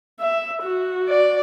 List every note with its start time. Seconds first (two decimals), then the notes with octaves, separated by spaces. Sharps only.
0.20 E5
0.62 F#4
1.09 D5